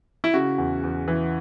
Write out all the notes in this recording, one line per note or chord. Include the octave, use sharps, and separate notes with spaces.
E4
C#3 F#4
E2
E2
E3